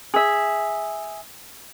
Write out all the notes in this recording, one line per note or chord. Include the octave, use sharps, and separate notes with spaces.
G#4 E5